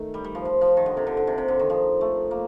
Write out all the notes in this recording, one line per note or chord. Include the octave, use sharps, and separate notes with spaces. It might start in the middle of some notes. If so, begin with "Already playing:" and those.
Already playing: D#3 A3
G3
G3
F3
F3
F3
D#3
D3
C3
D3
D3
C3
C3
D3
D#3
F3
A3
A#3